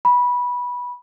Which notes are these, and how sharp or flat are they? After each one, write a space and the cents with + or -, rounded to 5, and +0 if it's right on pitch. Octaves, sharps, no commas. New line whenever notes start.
B5 -15